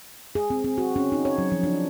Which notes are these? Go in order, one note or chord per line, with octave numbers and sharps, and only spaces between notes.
G#4
C4
C4
F#4
C#4
D#4
C#5
F#3
F3
D4